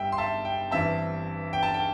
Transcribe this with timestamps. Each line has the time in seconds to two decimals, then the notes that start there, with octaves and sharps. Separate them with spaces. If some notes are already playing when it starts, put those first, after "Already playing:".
Already playing: G1 G2 G3 E5 G5
0.12 C6
0.18 E5 A5
0.45 G5
0.71 G1 G2 E3 C4 E5 A5
1.53 G5
1.63 A5
1.74 G5